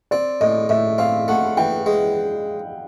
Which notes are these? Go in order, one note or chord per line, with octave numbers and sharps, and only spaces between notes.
C4 D5
A2 D#5
A2 E5
C4 F5
A3 F#5
E3 G5
G#3